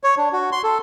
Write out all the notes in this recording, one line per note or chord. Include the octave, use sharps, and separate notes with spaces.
C#5
D4
F#4
C6
A4